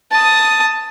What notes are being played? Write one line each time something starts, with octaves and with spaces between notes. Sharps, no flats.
A5 D#6